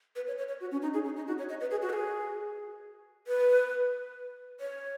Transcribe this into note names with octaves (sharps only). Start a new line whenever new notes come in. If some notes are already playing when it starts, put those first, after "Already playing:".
B4
C#5
C#5
C#5
F#4
C#4
D#4
G#4
C#4
D#4
F#4
C#5
D#5
B4
G#4
F#4
B4
G#4
B4
C#5